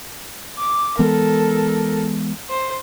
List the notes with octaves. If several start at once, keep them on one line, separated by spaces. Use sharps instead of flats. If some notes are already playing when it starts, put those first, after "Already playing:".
D6
E3 G#3 B3 A4 A#4
C5